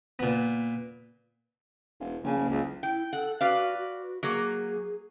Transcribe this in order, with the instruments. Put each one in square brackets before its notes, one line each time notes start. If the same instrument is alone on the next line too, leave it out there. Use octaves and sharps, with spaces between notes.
[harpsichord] A#2 B3
[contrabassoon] E1
[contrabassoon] A#1 [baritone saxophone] C#3
[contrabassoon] F#1
[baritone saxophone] C#2
[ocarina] E4 [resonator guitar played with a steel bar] G5
[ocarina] A4 [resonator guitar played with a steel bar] F#5
[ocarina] F#4 [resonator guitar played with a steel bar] B4 D5 F5
[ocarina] F#4
[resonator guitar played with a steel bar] F#3 A#3 [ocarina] G#4